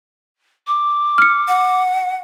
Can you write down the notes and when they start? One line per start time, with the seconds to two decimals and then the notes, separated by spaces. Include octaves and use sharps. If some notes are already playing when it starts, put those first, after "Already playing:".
0.67 D6
1.18 F6 C#7
1.48 F#5